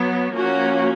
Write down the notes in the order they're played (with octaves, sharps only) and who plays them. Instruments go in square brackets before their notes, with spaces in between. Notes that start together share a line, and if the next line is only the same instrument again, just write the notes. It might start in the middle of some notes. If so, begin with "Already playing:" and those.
Already playing: [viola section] F#3 B3
F3 A#3 C#4 F#4